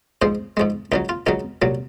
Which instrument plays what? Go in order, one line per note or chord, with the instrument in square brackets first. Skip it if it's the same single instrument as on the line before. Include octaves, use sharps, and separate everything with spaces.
[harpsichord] G#2 F3 G#3 C5
G#2 F3 G#3
C#2 C#3 F#3 D#4
F4
C#2 C#3 F#3 D#4
C2 A#2 F#3